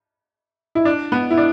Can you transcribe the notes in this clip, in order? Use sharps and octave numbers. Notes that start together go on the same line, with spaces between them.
E4
D4
B3
E4
D4